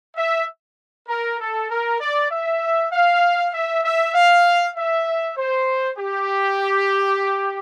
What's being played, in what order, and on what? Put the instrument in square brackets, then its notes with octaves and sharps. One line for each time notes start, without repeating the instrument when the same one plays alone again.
[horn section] E5
A#4
A4
A#4
D5
E5
F5
E5
E5
F5
E5
C5
G4